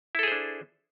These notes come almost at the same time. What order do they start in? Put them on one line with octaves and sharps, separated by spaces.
E4 A4 G#4 C5 D4